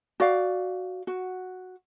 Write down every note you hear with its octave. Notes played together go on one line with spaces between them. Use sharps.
F#4 D5 F5
F#4